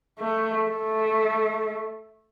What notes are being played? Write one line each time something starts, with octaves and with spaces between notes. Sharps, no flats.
A3
A3